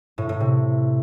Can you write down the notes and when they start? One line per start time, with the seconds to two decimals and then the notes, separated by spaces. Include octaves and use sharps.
0.18 A2
0.29 A2
0.40 C3